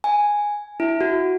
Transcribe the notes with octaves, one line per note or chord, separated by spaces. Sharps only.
G#5
E4
F#4